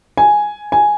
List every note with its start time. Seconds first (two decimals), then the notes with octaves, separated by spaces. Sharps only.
0.17 G#5
0.72 G#5